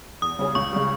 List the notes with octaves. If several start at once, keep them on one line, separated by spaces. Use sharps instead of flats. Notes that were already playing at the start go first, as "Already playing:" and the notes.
E2 D#6
C#3 G3 C#4 G#4
C#2 C#6
C#3 G3